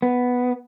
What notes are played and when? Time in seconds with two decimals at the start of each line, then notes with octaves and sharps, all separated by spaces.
0.02 B3